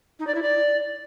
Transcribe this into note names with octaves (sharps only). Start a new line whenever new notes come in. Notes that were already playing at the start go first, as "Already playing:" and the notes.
D#4
D5
E4
D5